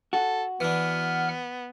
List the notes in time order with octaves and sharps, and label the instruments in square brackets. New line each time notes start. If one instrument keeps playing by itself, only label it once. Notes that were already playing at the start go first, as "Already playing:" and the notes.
[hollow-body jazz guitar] F#4 [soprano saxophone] A4
[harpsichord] E3 D4 [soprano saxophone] B3 [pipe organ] F#5 F6